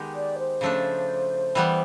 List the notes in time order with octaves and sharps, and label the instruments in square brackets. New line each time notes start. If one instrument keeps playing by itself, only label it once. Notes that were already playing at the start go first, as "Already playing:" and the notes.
Already playing: [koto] D#3 G#3 B3 D#4 G4
[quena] D5
C5
[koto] C#3 F3 A3 D4
E3 G3 B3